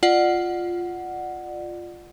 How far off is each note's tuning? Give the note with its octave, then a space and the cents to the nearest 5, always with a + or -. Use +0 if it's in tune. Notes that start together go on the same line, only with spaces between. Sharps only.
F4 +0 D5 +30 F#5 +0